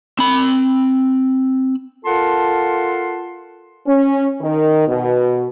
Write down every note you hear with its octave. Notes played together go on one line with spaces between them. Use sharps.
C4 B5
F4 A4 A#4 F#5 A5 C6
C#4
D#3
B2